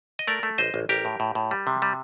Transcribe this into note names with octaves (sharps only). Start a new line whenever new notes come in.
D#5
A3 A#4 D5
A3
A1 C5 D#5
A1
A1 G4 A#4
A2
A2
A2
G3
C3
G3